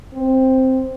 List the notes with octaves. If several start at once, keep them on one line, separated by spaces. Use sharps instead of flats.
C4